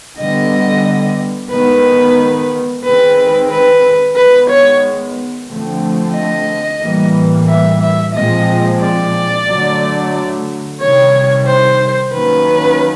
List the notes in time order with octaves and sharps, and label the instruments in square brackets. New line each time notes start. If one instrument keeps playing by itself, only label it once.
[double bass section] D3 G3 B3 [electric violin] D#5
[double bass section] D#3 G#3 B3 [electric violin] B4
[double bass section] D#3 G#3 C4 [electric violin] B4
[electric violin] B4
[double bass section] D#3 G#3 B3 [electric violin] B4
[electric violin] C#5
[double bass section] D3 F3 A3 C4
[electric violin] D#5
[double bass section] A2 E3 G3 A#3
[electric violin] E5
E5
[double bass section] A#2 F3 G#3 C4 [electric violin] D#5
[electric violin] D5
[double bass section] D3 F#3 A3
[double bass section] C3 D#3 G3 [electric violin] C#5
[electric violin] C5
[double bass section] D#3 F#3 A#3 C#4 [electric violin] B4